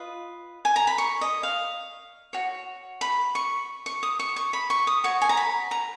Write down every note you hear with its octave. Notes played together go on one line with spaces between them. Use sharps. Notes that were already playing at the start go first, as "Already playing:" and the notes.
Already playing: F4 B4 D#5
G#5
A#5
B5
C#6
D#5
F5
F#4 C#5
B5
C#6
C#6
D#6
C#6
C#6
B5
C#6
D#6
F#4 C#5 C#6
G#5
A#5
B5
A#5